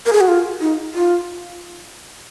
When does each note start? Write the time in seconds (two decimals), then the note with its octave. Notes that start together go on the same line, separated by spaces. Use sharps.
0.06 A#4
0.13 G#4
0.21 F#4
0.28 F4
0.61 D#4
0.94 F4